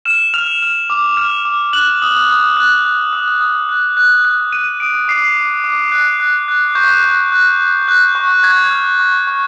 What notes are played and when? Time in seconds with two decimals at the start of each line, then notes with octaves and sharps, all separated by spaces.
0.05 F6 E7
0.34 F6 F7
0.62 F6
0.90 D6
1.17 F6
1.45 D6
1.73 F#6 F#7
2.02 D#6
2.29 D#6
2.57 F#6
2.86 F#6
3.13 D#6
3.40 D#6
3.69 F#6
3.97 F#6
4.25 F#6
4.52 F#6 D#7
4.80 D#6 D7
5.08 D6 C7
5.36 D6
5.64 D6
5.92 F#6
6.20 F#6
6.48 F#6
6.75 C#6 G6
7.04 F#6
7.32 F#6
7.59 F#6
7.88 F#6
8.15 C#6
8.43 C#6 G#6
8.71 F6
8.99 C#6
9.27 C#6